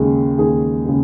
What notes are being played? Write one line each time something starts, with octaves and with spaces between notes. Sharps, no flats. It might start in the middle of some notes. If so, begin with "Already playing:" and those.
Already playing: D#2 C#3 G#3
D#2 G#4
C#3 G#3